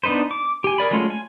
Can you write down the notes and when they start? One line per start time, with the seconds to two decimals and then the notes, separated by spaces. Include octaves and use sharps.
0.03 B3 D4 D#4 B4 C5
0.31 D6
0.64 G4 G#5
0.78 G#4 A#4 D5 B5
0.91 F#3 G#3 A3 C#4 F4
1.10 G#5